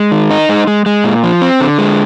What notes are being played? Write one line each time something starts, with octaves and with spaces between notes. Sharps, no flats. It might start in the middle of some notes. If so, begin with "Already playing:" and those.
Already playing: G#3
D#3
D#4
G#3
G#3
G#3
A#2
F3
C4
D3
G#3